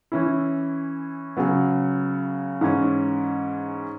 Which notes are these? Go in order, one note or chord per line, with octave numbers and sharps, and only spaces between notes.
E3 C#4 E4
C#3 F#3 B3
G#2 E3 C#4